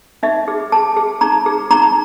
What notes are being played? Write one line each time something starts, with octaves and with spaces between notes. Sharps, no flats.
D#4 E5
G#4
G#4 A5
G#4
D#4 A#5
G#4
D#4 A#5